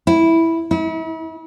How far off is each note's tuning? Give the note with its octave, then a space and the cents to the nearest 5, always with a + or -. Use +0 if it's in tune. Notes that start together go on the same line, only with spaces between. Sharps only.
E4 -5
E4 -40